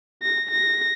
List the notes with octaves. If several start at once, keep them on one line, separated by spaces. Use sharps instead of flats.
A#6
A#6